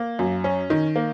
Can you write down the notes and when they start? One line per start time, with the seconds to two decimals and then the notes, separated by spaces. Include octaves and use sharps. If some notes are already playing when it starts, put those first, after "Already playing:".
Already playing: A#3
0.19 F#2
0.44 C#4
0.70 D#3
0.96 A#3